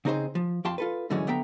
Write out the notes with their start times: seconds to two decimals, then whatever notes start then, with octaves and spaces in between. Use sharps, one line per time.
0.05 C#3 C4 D#4 G#4 B4 C5
0.35 F3
0.65 F2 F4 G5 A5 C6
0.78 F4 A4 B4
1.10 G#2 D3 E3 F#3 G#3 C#4
1.27 D3 B3 E5 G5 A#5